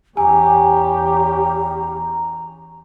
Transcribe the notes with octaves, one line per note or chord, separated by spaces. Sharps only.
E2 C#4 G4 G#5 A#5